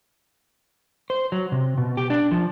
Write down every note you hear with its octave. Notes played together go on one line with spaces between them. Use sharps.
C5
F#3
C3
B2
G4
D4
F3